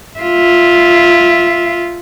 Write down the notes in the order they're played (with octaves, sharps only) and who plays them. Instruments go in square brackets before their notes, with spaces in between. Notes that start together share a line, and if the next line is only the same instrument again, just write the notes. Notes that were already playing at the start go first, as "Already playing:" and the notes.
[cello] F4 E5